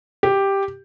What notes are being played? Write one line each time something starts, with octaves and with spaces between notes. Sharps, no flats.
G4